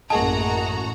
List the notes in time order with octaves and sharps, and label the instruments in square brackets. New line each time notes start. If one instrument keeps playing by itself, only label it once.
[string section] A1 F#4 A#5 [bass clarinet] F#2 [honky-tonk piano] A#3 G#4 D#5 [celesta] A5